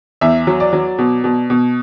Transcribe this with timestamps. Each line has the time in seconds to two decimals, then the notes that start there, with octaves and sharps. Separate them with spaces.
0.21 E2 E5
0.47 F#3
0.60 D5
0.73 F#3
0.98 B2
1.24 B2
1.50 B2